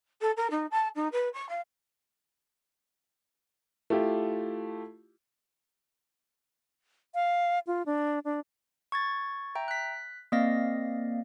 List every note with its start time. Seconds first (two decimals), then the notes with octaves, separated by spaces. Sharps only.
0.21 A4
0.37 A#4
0.50 D#4
0.71 A5
0.95 D#4
1.12 B4
1.33 C#6
1.49 F5
3.90 A3 E4 F4 G4
7.15 F5
7.67 F4
7.86 D4
8.25 D4
8.92 C#6 G#6 A6
9.55 E5 G5 A#5
9.68 F#6 B6
10.32 A#3 C4 D5 D#5 F5 A#6